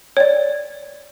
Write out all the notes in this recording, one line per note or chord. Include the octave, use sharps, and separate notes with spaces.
C#5 D5